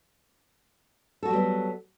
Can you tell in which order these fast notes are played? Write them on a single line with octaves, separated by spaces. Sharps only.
A4 F#4 G3 F#3 B3